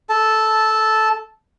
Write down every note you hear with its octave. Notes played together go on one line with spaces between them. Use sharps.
A4 A5